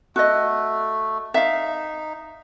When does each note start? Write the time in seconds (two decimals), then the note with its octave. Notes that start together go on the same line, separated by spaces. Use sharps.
0.16 A3 F#4 D#5
1.34 D#4 E5 F5